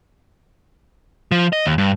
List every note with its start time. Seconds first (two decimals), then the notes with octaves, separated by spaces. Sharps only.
1.32 F3
1.53 D#5
1.66 D#2
1.78 G2